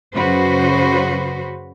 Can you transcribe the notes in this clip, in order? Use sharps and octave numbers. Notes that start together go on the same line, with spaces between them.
F#2 C#3 F#4 B4 C5